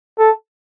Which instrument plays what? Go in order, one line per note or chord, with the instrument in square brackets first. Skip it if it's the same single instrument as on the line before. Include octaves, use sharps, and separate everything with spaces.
[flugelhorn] A4